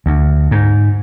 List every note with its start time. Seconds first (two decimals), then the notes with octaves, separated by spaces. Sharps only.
0.06 D2
0.51 G#2